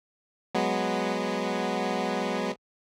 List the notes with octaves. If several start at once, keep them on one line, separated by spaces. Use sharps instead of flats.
F#3 G#3 B3